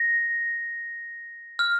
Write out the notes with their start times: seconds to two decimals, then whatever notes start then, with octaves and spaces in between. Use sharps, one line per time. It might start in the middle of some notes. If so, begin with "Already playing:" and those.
Already playing: A#6
1.59 F6